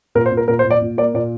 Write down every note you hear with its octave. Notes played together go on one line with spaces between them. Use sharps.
A#2 A#4
C5
A#2
A#4
A#2 A#4
C5
A#2
D5
A#2
A#3 D5
A#2 D5